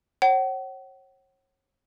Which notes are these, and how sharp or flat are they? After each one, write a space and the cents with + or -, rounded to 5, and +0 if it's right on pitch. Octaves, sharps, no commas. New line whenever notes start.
C#5 -35 F#5 +40